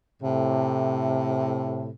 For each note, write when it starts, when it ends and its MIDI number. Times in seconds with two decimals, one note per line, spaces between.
0.21 1.88 45
0.21 1.88 48